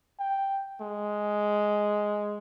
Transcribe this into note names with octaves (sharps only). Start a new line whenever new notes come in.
G5
G#3